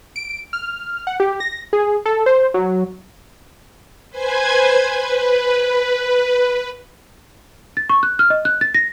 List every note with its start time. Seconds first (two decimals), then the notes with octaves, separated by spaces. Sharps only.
0.16 D7
0.53 F6
1.07 F#5
1.20 G4
1.40 A#6
1.73 G#4
2.06 A4
2.26 C5
2.54 F#3
4.10 B4 C5 G#5 G#6
4.96 B4
7.77 A6
7.89 C#6
8.03 F#6
8.19 F6
8.30 D#5
8.45 F#6
8.61 A6
8.74 A#6